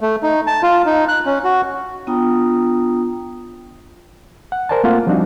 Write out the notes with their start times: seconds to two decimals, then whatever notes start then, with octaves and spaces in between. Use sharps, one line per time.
0.01 A3
0.23 D#4
0.47 A5
0.62 F4
0.86 D#4
1.08 F#6
1.26 C#4
1.44 F#4
2.07 B3 D4 F4 G5 A#5 D#6
4.52 F#5
4.69 A#4 C5 D5 G#5 A5
4.84 A3 A#3 C4 F4 F#5
5.07 F3 G3 C4 D4 D#4 F#4